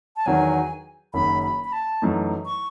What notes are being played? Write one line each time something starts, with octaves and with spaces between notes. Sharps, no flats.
A5
E2 D#3 F#3 G#5
F#1 F#2 D#3 B5
B5
B5
A5
F#2 E3 A3 D#4
C#6